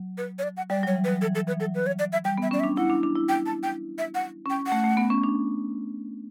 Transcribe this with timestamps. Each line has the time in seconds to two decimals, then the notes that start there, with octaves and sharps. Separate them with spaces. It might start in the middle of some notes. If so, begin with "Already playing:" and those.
Already playing: F#3
0.18 B4
0.39 C#5
0.43 D5
0.57 F#5
0.70 G3 D5
0.83 F#3 C#5
0.96 E3
1.04 B4
1.08 F#3
1.21 E3 A4
1.34 F#3 A4
1.47 E3 B4
1.60 F#3 A4
1.75 B4
1.87 C#5
1.99 D5
2.13 E5
2.25 G3 G5
2.38 B3 E5
2.51 C#4 D5
2.60 E5
2.64 D4
2.77 E4 F#5
2.90 D4
3.03 D4
3.16 E4
3.29 G5
3.46 A5
3.63 G5
3.98 E5
4.15 F#5
4.46 C#4 G5
4.67 A3 F#5
4.84 A3
4.97 B3
5.10 C#4
5.24 D4